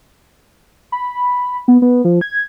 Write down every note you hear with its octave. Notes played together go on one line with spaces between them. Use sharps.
B5
B3
B3
F3
G#6